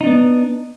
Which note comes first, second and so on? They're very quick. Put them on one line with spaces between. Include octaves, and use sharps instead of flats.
D#4 D4 B3